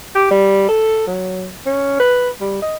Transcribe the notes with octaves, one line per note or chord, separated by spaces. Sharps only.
G4
G3
A4
F#3
C#4
B4
G3
D#5